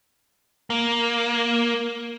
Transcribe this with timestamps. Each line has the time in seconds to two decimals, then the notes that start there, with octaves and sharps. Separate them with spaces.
0.70 A#3